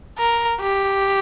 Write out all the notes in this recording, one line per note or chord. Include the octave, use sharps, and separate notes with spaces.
A#4
G4